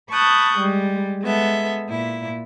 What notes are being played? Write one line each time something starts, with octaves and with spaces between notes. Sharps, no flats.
A5 B5 C#6 D#6 F#6 G6
G3 G#3
G#3 B3 A4 E5
A#2 E4